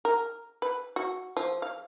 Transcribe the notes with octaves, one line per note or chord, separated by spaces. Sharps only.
A#4
B4
F#4
F3
F5